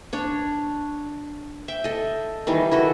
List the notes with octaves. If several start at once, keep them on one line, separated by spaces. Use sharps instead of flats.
D4 C#5
E5 G5
A4 D#5
D#3 E3 G3
E4 F#4 A4 D#5